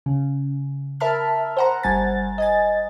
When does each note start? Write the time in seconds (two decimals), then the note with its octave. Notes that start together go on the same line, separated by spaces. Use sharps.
0.06 C#3
1.00 A#4 E5 A5 B5 F6
1.57 C5 F#5 A#5
1.83 G1 G3 G#5 A6
2.38 D#5 G#5 A6